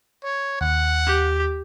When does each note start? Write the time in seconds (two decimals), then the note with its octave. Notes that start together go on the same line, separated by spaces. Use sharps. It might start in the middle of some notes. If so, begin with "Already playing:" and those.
0.24 C#5
0.61 D#2 F#5
1.07 G4